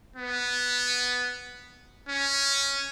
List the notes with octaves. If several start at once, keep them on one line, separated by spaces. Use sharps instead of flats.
B3
C#4